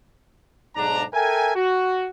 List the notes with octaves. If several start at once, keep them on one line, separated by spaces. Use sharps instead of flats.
B1 G#2 D4 A#5
A4 A#4 E5 G5 G#5
F#4